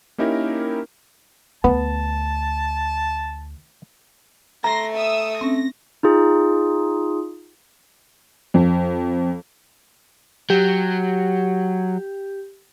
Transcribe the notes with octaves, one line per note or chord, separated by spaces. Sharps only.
A#3 C#4 D#4 E4 G4 A#4
D2 B3 A5
A3 A#5 C6 A#6
E5 D#6 E6
C4 C#4 A#6
D#4 F4 G#4
F2
F#3 G4